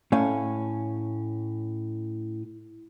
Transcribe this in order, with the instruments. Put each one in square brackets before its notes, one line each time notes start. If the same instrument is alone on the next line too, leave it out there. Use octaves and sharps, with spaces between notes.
[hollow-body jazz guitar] A2 A3 C#4 F5